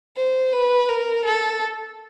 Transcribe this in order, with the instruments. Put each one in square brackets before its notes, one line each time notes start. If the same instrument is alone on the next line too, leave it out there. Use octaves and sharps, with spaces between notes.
[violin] C5
B4
A#4
A4